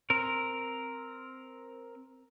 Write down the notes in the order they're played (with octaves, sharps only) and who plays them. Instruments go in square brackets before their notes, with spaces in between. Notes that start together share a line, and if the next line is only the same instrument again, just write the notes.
[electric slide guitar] C4 A#4